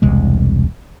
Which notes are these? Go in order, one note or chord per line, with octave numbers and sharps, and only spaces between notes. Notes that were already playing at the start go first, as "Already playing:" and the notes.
E1 C2 G#3